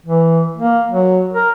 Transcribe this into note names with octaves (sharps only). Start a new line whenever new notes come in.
E3
A#3
F#3
A#4